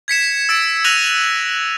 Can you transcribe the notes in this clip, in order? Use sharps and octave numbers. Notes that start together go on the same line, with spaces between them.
G#6 B6 C#7 E7
E6 A6 D7
E6 F#6 A#6 D#7 F7 F#7